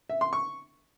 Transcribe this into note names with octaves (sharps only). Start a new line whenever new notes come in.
E5
C6
C#6